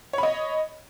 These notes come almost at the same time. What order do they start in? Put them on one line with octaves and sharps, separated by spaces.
C#5 B5 D#5